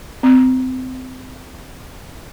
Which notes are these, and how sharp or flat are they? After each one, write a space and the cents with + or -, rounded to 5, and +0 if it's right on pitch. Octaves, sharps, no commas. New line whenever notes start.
C4 -30